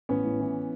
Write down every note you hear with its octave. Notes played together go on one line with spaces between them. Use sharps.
A1 B3 C#4
A2
E3